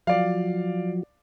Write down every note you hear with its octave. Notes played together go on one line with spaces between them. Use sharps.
F3 F#3 D5 F5